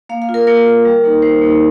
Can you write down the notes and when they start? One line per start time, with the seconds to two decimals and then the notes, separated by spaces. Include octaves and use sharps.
0.09 A#3 F5
0.22 F5
0.29 F4
0.34 A#4
0.47 A#3 A#4
0.66 F4
0.85 G3
1.04 A#3 D#4
1.22 G3 C5
1.41 A#3 D#4